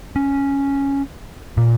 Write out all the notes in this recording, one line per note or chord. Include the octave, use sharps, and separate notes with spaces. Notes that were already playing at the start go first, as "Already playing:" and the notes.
C#4
A#2